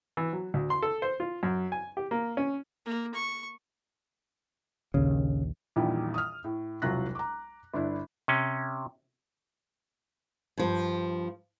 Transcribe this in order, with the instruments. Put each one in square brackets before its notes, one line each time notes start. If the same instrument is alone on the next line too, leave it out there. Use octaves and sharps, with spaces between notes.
[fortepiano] E3
F#3
D2
C6
A4
C5
F4
F#2
G#5
G4
A#3
C#4
[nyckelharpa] A#3
C#6
[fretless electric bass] A#1 D#2 [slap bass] C#3
[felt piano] A#1 E2 A#2 D#3 G3
D#6 F6
A2
E1 C2 F#3 F4 F#6 A#6
A#5 D6
G1 D4 E4
[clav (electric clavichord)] C3 C#4
[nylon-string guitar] G2 F3